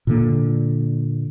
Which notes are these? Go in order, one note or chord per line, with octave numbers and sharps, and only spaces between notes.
A#2 D3 A#3